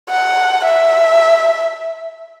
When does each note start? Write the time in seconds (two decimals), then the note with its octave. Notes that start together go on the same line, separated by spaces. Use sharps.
0.10 F#5
0.65 E5